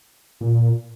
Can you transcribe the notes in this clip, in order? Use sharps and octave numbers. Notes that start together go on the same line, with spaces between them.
A#2